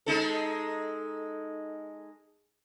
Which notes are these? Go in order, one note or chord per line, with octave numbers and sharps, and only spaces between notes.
G#3 D#4 A4